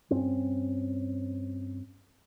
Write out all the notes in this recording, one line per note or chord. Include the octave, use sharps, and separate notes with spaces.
G2 C4 C#4